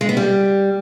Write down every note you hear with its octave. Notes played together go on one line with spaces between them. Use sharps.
G#3
B3
G3